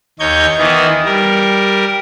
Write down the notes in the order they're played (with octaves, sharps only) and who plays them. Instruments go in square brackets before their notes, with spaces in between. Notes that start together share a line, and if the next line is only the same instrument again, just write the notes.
[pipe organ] D#2 D#4 C#5 G6 G#6
D#3 E3 B3 D#4
G3 A#4